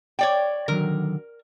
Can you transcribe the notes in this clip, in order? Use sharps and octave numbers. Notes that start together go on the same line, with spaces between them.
C#5 D5 G5
D3 D#3 F#3 A#4